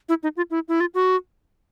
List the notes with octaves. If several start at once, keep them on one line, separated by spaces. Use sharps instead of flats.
E4
D#4
F4
E4
E4
F4
F#4